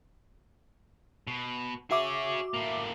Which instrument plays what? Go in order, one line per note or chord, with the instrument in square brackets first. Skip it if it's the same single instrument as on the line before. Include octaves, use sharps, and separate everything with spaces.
[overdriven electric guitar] B2
[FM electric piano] F#4 E5 D6 [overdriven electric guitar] G#4 C#5
[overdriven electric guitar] A2 A#3